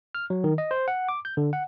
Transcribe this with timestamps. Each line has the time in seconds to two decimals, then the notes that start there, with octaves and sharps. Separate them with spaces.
0.15 F6
0.30 F#3
0.44 D#3
0.58 D#5
0.71 C5
0.88 F#5
1.09 D6
1.25 G6
1.37 D3
1.53 F#5